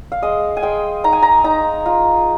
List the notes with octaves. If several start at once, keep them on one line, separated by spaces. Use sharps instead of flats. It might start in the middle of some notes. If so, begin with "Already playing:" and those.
F5
G#3 D#5
G#5
G#3 G5
D#4 A#5
G#5
A#5
D#4 A#5
F4